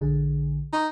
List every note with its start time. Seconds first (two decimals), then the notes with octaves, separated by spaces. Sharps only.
0.01 A#1 D3 G#4
0.73 D#4